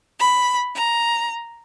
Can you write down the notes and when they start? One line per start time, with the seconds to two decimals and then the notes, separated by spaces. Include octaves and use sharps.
0.19 B5
0.75 A#5